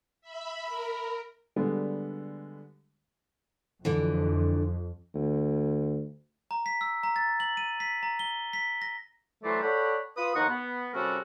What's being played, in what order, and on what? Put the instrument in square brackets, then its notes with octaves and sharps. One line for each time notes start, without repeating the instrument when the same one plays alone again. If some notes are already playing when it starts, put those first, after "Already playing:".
[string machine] E5 B5
[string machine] A#4 [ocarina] B5
[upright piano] D3 G3 G#3 B3
[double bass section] F2 [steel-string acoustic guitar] D3 E3
[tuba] D2
[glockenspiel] A#5
B6
E6
A#5
A6
F#7
D#7
B6
A#5
G7
B6
A#6
[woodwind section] E3 F#3 A3 B4 C5 D5
A4 C#5 D5 F#5 G5 B5
F4 B4 D#6
D#2 F3 D#4 F#5 A#5 C#6
B3
C3 G3 C#4 F#4 A4 A#4